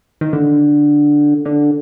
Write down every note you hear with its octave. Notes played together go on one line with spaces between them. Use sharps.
D#3
D3
D3